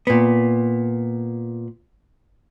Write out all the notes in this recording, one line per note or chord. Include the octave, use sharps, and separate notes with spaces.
A#2 B3